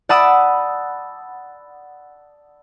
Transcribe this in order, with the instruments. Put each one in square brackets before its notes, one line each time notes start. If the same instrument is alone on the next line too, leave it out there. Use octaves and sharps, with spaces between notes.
[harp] D5 F#5 A5 B5 D#6 E6